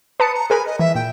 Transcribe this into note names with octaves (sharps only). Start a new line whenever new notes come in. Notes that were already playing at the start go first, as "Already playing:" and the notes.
B4 A5 D#6 C#7
A#5
G#4 A#4 B4 G#5
D#5
E3 E5
A#2 G5